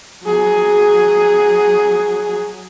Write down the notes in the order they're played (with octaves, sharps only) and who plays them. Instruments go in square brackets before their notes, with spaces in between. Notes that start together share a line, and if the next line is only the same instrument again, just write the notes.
[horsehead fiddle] F#3 G#4